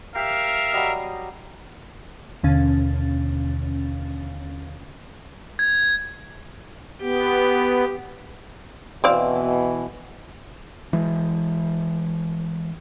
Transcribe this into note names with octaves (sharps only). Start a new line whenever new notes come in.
G4 A#4 E5 F5
F#3 G3 D#5
D#2 B2 D3 C#4 F5 A6
G#6
B3 G4
B2 E3 C4 D5 F5
E3 G#3